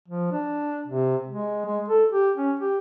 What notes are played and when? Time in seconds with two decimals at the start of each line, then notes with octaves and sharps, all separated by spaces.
0.08 F3
0.32 D4
0.88 C3
1.28 G#3
1.66 G#3
1.88 A4
2.12 G4
2.37 C#4
2.60 G4